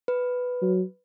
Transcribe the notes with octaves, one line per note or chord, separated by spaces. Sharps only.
B4
F#3